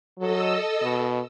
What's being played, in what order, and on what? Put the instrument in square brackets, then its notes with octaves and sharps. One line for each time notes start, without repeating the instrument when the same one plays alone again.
[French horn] F#3 [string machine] A4 D#5 E6
[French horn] B2